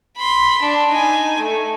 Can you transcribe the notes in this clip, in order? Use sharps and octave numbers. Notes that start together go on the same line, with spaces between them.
B5 C6
D4
D#4 G#5
A3